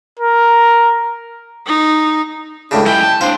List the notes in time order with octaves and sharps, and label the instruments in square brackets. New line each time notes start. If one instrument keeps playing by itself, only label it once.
[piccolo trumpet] A#4
[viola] D#4
[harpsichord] C#2 A2 C#3 [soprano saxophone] D4
[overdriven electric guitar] G3 G#3 [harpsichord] E4 [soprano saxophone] G5
[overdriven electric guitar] A5
[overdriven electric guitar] C4 D4 [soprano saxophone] C5 [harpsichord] F5